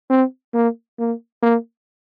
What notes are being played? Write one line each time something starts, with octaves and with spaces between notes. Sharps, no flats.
C4
A#3
A#3
A#3